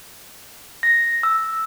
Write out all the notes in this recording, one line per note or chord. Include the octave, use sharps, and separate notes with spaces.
A#6
E6